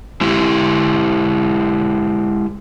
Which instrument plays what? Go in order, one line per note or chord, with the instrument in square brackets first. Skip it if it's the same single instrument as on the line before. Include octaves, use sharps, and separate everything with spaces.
[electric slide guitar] G#3 E4 G4